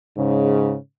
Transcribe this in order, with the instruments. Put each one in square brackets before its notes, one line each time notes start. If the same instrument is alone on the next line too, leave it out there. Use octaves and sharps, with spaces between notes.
[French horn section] G#2 C#3